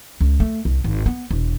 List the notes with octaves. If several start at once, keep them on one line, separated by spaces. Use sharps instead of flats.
C#2
A3
C2
G#1
B3
E1